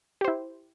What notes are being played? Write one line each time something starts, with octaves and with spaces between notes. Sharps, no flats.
E4 G4 C5